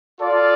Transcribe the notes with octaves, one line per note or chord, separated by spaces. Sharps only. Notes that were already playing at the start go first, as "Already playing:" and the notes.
F4 A4 D5 F5